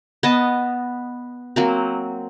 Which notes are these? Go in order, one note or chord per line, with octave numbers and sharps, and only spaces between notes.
B3 D#5 A5
F#3 A#3 C4